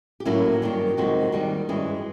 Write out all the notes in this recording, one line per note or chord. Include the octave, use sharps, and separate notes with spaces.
G4
A2 F#3 A#3 C#4 E4 F#4
G2 D#3 F#3 A#3 D4
F2 C3 D#3 G#3 F#4
D#2 D#3 G3 A#3 D4
G2 E3 G#3 C#4 E4 G#4